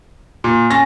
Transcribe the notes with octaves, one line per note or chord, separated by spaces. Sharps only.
A#2
C#4 A5 A#6